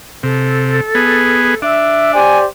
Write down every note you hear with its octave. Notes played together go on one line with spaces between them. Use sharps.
C3 A4
B3 G#4
D4 E5
G4 C5 D5 G#5